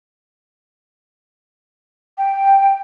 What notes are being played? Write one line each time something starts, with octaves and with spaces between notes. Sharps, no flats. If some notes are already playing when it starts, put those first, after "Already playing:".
G5